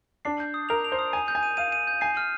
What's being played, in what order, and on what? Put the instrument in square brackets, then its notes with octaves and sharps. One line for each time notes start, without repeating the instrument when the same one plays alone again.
[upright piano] D4 [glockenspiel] C7
[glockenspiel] G6
D#6
[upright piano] A#4 [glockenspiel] F7
[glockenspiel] F7
[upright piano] C5
[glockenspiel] D#6
[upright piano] G#5 [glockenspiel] D#7
[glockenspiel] G6
[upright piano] G#5
[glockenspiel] D#7
[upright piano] F5 [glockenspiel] D#7
[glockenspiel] D#7
G6
[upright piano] G#5 [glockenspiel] C7
[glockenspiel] F6